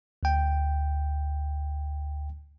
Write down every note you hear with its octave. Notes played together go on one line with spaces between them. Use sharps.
D2 G5